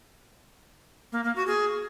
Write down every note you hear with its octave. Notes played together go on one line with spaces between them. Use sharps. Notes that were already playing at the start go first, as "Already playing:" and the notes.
A#3
A#3
F#4
G#4